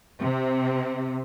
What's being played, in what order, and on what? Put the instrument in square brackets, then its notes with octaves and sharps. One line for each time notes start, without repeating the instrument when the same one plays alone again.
[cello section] C3